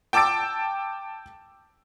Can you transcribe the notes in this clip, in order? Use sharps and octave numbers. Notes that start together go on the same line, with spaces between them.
G5 A5 D6 E6 A6 D7